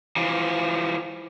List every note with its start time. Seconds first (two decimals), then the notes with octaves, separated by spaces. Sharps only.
0.16 E3 F3